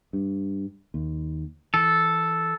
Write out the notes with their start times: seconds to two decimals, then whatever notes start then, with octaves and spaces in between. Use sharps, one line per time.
0.13 G2
0.94 D#2
1.74 E3 A4